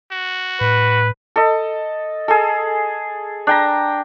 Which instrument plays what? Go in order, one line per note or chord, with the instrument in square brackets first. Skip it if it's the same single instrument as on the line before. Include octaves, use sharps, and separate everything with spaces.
[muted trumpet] F#4
[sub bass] A2 [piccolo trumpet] B4
[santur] A4 D#5
G#4 A4
D4 G5 A#5